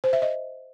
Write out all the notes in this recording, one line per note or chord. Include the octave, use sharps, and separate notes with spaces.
C5
E5
D#5